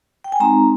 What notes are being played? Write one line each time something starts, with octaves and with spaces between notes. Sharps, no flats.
G5
G#5
G#3 C4 D#4 A#5